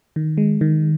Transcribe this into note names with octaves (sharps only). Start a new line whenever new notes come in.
D#3
G#3
D#3